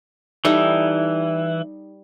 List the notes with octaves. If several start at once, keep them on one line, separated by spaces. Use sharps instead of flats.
E3 G3 D#4 E4 A4